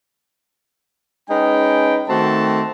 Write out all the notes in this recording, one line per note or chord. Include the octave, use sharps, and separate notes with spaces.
G#3 C#4 D#4 B4 G5
D#3 A3 C4 F#4 A5